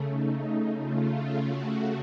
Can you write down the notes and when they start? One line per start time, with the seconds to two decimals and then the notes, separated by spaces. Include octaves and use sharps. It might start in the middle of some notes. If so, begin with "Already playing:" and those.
Already playing: C#3 A3
0.10 D#4
0.78 C#3 A3 F4
1.47 F#4